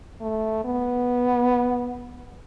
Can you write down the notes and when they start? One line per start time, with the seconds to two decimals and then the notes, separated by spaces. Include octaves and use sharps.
0.21 A3
0.65 B3